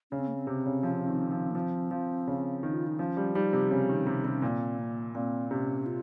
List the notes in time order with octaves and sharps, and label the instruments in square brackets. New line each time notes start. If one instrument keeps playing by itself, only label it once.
[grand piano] C#3 [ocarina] C#4
[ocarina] C4
A#3
C4
[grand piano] C3
C#3
F3
D#3
F3
[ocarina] A#3
[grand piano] F3 [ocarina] C4
[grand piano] F3
C#3
D#3
[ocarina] F4
D#4
[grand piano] F3 [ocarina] C#4
[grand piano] G3
[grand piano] G3 [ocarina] D#4
[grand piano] C3
[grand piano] C#3 [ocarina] C4
[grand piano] D#3
[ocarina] C4
[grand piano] C3 [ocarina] C#4
[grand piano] C3
[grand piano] A#2 [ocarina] C4
[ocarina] A#3
[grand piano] A#2 [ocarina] C4
[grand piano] C3 [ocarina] C#4
[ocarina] F4